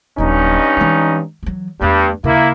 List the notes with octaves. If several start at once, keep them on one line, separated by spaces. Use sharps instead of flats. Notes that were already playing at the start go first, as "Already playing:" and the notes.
D#1 G2 F#3 C#4 D#4
E3 G#3
E3 F#3
E2 G2 A3
D#2 C#3 A#3 E4